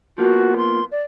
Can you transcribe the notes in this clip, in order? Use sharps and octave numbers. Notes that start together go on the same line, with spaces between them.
F3 A#3 B3 F#4
C6
D5